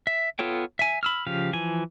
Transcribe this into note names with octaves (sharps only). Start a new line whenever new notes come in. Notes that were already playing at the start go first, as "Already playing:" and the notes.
E5
B3 F4 A4 C#5 G5
E5 G#5
B5 E6 F6
C#3 F3 G4 F5
E3 F3 G#5